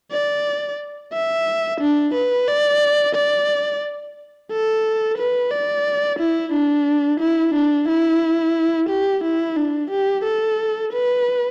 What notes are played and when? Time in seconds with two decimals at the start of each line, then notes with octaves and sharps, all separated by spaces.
0.12 D5
1.13 E5
1.81 D4
2.15 B4
2.48 D5
3.16 D5
4.51 A4
5.18 B4
5.52 D5
6.20 E4
6.53 D4
7.21 E4
7.54 D4
7.89 E4
8.90 G4
9.24 E4
9.57 D4
9.91 G4
10.24 A4
10.93 B4